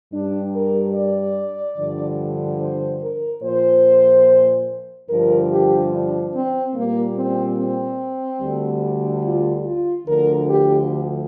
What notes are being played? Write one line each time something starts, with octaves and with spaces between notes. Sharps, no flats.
G2 G3 D4
A#4
D5
G2 D3 F3
C5
A#4
A#2 F3 C5
G2 D3 F3 A#4
G4
D4
C4
A#2 G3 A#3
C4
C4
D2 D3 G3
F4
F4
D2 D3 F3 A#4
G4